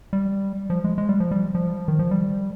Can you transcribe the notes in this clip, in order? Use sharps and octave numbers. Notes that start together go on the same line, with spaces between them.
G3
F3
G#3
G#3
G3
F3
G3
F3
D#3
F3
G3